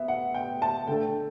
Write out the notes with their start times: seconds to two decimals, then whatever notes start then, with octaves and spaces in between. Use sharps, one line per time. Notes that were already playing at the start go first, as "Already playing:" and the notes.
Already playing: B3 E5
0.08 F#5
0.34 G5
0.62 A5
0.87 D3 A3 G5